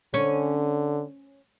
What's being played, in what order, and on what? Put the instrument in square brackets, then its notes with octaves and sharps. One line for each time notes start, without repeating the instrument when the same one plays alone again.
[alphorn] D3 [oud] C#4